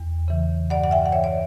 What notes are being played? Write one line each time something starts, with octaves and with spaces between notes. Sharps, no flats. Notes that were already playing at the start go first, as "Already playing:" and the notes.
Already playing: E2
C#3 E3
G2 D5 F#5
F#5
E5 G5
F#5
E3 C#5 E5
D5